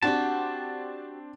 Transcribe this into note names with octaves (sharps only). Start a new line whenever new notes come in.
C4 D4 F#4 G4 A5